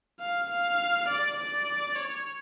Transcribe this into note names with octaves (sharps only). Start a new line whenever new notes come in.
F5
F5
D5
D5
C#5